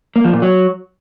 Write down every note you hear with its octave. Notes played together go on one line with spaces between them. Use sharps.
A#3
F3
A#2
F#3